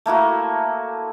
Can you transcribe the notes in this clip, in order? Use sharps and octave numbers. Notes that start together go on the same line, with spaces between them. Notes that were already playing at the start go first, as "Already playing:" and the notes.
A3 A#3 E4 F#4